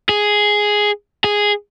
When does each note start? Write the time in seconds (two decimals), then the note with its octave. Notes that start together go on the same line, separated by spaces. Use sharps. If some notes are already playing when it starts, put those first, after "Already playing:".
0.09 G#4
1.24 G#4